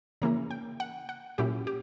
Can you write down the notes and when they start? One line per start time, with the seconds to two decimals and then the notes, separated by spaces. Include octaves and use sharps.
0.22 C#3 E3 A#3 C#4 E4 A#5
0.51 G5
0.80 F#5
1.09 F#5
1.38 A#2 F#3 C#4 E4 G4
1.67 G4